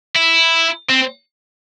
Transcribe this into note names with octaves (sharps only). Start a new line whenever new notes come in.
E4
C4